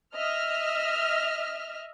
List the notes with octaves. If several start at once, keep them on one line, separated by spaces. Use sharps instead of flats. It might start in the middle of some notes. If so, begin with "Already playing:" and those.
D#5 E5 F6